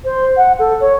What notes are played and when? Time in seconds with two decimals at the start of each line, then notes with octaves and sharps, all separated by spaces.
0.05 C5
0.37 F#5
0.59 A4
0.80 C#5